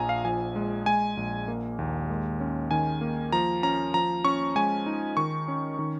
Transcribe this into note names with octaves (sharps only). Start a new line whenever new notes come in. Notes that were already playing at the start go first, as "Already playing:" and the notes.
Already playing: A#1 F3 G#5 A#5
F5
F3 G#5
G#3
G#3 G#5
A#1
A#3
D#2
G#3
C#4
D#3 G#5
A#3
F3 A#5
C#4 A#5
F3 A#5
C#4 C#6
G#3 G#5
D#4
D#3 C#6
C#4
D#3